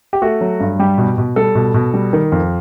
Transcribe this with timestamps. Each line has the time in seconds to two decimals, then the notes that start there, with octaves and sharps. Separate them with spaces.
0.13 G4
0.22 A3 F#4
0.41 F#3
0.60 G2
0.79 G3 G4
0.98 B2
1.18 B2
1.36 G3 A4
1.55 B2
1.74 B2
1.94 G3
2.13 D#3
2.32 F2